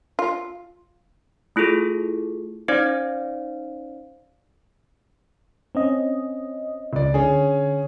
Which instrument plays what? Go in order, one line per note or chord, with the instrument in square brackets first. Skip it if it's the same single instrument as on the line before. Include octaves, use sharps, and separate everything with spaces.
[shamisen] F4
[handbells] A3 E4 F4 G#4 A4
C#4 D#4 C5 D5 F5
[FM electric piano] C4 C#4 D#5
[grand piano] C#2 D5
[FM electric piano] D3 [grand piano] C#4 G#4